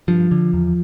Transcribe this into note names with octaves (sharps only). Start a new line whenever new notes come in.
G2 F3
D3
E2